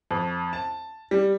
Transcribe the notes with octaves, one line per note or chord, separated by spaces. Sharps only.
F2
A5
G3